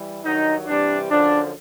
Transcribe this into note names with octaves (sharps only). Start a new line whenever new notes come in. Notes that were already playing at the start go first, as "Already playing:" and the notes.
Already playing: E3 G3
G2 D#3 F#3 D#4
C3 E3 G3 D4
F#2 D3 F3 D4